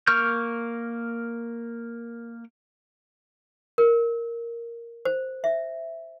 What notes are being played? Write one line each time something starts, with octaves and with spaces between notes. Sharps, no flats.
A#3 A#4 C#6 F6 G6
A#4
C5
E5